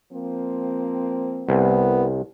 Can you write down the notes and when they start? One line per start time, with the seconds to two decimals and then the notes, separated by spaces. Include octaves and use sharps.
0.12 F3 A#3 C4
1.49 C2 B3